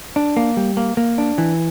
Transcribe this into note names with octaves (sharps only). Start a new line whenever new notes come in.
D4
A#3
G3
A#3
A#3
D4
E3